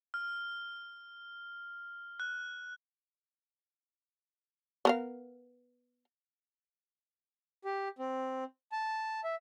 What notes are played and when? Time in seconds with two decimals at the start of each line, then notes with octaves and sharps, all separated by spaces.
0.14 F6
2.20 F#6
4.85 B3 A#4 F5
7.65 G4
7.99 C4
8.72 A5
9.24 E5